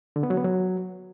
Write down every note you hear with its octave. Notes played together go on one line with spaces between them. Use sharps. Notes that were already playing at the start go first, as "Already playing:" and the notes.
D3
B3
F#3
B3
F#3